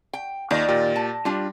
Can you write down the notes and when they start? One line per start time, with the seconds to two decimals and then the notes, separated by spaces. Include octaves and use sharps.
0.13 G5
0.51 D#2 D#3 F4 D5 A#6
0.69 A#2 G4
0.96 A5
1.25 G3 D4 F4